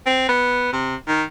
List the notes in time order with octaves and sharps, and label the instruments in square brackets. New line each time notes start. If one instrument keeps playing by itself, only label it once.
[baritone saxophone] C4
B3
C3
D#3